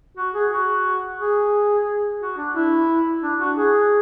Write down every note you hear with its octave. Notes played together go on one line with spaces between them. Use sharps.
F#4
G#4
F#4
G#4
F#4
D4
E4
D4
F#4
G#4